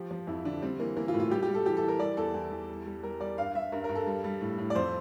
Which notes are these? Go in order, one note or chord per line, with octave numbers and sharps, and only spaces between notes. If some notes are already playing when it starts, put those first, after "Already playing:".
Already playing: F3 G4
F3
F2 E4
D3 D4
G3 C4
E3 A#3
E3 A#3
F4
A2
F4
G3 G4
G4
G3
A4
E3 G4
A4
E3
A#4
G3 D5
E2 A4
E2
E2
G3
G3
G3 A#4
G3 D5
G2 F5
G2 E5
G2 A#4
G2 A#4
A4
G3
G3
A2
A2
D5
F2 C5